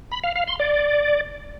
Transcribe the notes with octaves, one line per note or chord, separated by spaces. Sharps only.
B5
F5
F5
C6
D5